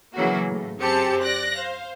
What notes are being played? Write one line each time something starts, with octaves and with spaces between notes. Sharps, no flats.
C#3 E3 F#3 A#3 F#4
A2
F#2 C4 G4 G#4 A5 C#7
D5 F#6 A#6
C5 F5